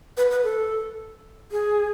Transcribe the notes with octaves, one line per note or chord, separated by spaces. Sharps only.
B4
B4
A4
G#4